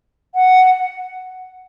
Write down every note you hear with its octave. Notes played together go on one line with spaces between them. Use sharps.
F#5